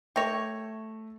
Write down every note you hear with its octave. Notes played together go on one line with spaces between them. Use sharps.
A3 G4 A4 C#5 E5 A#6 F7